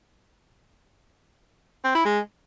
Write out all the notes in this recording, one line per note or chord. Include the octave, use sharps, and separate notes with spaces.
C4
E4
G#3